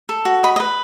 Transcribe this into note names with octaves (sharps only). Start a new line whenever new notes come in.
A4
F#4
D#5 B5
D#5
B4